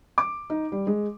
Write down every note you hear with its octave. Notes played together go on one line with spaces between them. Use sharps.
D6
D#4
G3
G#3